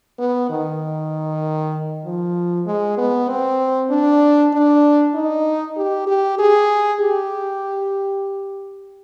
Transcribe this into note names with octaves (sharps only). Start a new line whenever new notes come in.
B3
D#3
F3
G#3
B3
C4
D4
D4
D#4
G4
G4
G#4
G4